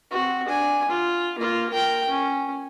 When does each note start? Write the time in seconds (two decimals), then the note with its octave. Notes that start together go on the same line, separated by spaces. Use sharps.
0.11 C4 F#4
0.47 D4 G#5
0.88 F4
1.39 A#3 F4
1.70 A#4 G5
2.09 C#4